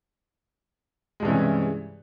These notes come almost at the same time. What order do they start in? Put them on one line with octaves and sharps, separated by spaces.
G#3 G2 E3 C3 C#4